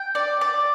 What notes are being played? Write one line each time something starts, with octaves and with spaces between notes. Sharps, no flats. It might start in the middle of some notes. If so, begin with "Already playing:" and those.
Already playing: G5
D5
D5